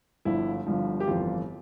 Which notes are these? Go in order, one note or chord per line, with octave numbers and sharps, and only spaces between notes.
G1 G2 F3 E4
G1 G2 F3
G4
G1 F2 E3 F4